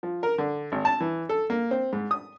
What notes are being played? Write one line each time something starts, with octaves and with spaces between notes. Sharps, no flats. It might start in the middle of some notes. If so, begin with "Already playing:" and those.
F3
A#4
D3
G#1
A5
E3
A4
A#3
C4
G#2
D#6